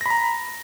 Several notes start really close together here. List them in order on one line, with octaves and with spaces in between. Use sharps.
A#6 B5 A#5